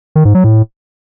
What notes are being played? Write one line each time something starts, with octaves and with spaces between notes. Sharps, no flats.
D#3
G#2
F#3
A2